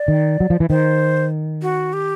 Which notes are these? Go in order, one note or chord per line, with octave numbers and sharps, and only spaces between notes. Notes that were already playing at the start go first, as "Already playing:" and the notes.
Already playing: D5
D#3
F#3
F3
E3
D#3 C5
F#4
G4